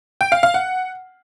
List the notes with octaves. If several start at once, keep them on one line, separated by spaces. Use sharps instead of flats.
G5
F5
F5
F#5